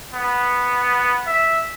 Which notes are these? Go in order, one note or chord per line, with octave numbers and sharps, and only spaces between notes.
B3
E5